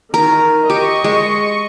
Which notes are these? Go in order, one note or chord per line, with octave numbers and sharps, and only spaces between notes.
D#3 A#4
G4 D#5 C#6
G#3